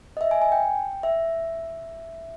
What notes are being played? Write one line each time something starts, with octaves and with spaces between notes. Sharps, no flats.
D#5
E5
G#5
G#5
G5
E5